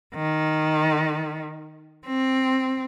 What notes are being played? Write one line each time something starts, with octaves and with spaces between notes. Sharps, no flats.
D#3
C4